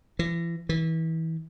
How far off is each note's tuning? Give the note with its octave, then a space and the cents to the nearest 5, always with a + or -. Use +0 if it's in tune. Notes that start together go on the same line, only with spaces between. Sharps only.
E3 +35
E3 -30